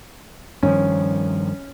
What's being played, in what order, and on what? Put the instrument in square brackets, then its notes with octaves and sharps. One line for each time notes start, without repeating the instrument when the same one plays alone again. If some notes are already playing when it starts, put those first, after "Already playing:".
[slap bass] G2 D#3 F3 [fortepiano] C#4